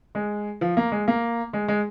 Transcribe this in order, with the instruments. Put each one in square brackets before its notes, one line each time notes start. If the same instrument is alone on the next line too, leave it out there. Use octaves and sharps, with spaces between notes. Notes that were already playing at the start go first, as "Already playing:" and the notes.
[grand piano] G#3
F3
A#3
G#3
A#3
G#3
G#3